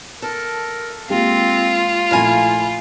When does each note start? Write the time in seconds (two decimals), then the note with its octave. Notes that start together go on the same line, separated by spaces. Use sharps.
0.22 A4 A#4
1.10 G#3 A#3 C4 F4 G4
2.11 A#1 A3 E4 A#4 F5 G#5